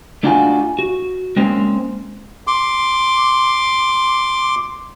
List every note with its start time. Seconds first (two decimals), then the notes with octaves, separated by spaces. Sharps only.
0.23 A3 D4 D#4 F4 F#4 G#5
0.79 F#4
1.36 G#3 A#3 C4 C#4
2.47 C6 D6